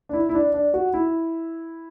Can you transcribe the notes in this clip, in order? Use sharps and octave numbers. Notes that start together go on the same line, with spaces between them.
D4
E4
E4
D4
D4
F#4
E4